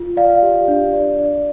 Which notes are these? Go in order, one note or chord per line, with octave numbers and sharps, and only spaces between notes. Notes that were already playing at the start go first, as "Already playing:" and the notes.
Already playing: F4
D5 F5
G4
D4
D5
D5